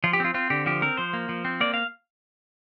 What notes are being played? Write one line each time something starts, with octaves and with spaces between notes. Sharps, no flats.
F3 F4
G4
C4 F4
C4 F4
D3 G4
F3 G4
C4 A#4
F3 C5
A#3
F3
C4
A#3 D5
F5